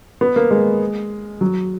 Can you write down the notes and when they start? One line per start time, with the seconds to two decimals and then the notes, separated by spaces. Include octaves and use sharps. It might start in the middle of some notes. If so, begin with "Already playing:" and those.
0.21 B3
0.36 A#3
0.51 G#3
1.41 F#3